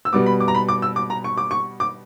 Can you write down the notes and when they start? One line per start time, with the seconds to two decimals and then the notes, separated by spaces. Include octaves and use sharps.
0.05 E6
0.13 B2 G3 B3 D6
0.26 B5
0.40 D6
0.48 A#5
0.55 B5
0.69 D6
0.82 E6
0.96 D6
1.10 A#5
1.24 C#6
1.38 D6
1.51 C#6
1.80 D6